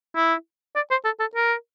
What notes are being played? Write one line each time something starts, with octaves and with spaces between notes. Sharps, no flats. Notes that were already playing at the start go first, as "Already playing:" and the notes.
E4
D5
C5
A4
A4
A#4